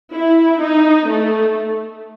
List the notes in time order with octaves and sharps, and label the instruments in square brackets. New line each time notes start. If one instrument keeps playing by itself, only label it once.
[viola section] E4
D#4
A3